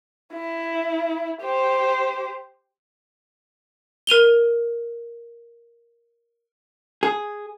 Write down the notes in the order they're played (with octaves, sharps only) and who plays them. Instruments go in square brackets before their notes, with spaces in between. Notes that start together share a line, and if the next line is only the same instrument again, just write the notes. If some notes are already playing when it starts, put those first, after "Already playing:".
[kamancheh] E4
G4 C5
[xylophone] A#4 D#7 F7 G7
[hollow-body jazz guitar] G#4